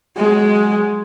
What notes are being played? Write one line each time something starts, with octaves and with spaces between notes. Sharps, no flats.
F#3 G#3